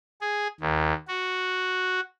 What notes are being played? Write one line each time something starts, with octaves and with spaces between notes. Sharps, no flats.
G#4
D#2
F#4